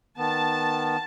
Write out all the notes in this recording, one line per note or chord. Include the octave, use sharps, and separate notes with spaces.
D#3 B3 A5